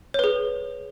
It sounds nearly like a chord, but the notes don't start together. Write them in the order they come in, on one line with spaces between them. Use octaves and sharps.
C#5 B4 G#4